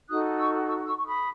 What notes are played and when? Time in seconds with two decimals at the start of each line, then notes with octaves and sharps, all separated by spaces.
0.09 D#4 F#4 A4 D#6 F#6
0.38 C#6 E6
0.68 C#6 E6
0.87 C#6 E6
0.98 C#6
1.06 B5 D#6